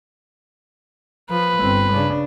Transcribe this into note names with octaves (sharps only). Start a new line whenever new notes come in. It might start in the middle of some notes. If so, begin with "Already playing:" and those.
F3 B4
G1 C4
C#3 D4